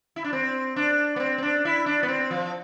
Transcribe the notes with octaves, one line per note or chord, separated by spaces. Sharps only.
E4
D4
C4
D4
B3
C4
C4
D4
E4
D4
B3
C4
F3